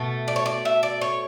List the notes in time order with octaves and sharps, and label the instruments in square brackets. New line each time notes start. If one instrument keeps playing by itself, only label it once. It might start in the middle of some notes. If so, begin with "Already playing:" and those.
Already playing: [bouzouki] B2 A3
D5
C#5
D5
E5
D5
C#5